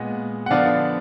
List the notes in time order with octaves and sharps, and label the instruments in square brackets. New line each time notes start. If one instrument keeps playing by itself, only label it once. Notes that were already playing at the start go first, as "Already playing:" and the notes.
Already playing: [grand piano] A#2 G#3 B3 D#5 F#5
F#5
D3 F3 B3 D5 F5